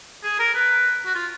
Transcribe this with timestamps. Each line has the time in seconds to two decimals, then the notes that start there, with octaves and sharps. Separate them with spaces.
0.24 G#4
0.40 A#4
0.55 B4
1.06 F#4
1.15 F4